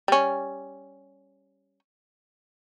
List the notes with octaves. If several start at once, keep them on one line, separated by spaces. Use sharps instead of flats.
G3 C#4